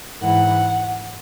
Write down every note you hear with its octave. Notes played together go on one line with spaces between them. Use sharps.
G#2 E3 F#5